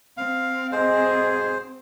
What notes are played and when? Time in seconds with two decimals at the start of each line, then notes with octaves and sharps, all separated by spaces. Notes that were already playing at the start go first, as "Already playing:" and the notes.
0.17 C4 F5
0.72 B1 G#2 G#4 C5 D#5